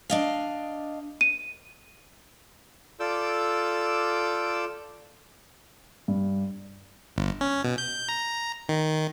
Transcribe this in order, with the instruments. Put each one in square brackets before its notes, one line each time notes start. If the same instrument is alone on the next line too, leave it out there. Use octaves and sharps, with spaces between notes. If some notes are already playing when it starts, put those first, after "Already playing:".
[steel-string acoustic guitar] D4 D#5 F5
[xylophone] D#7
[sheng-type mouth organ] F4 A4 D5 D6 E6 G6
[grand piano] G2
[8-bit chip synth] G1
C#4
B2
G6
A#5
D#3